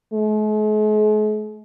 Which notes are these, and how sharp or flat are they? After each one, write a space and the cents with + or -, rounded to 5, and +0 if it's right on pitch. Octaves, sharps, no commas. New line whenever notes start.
G#3 +45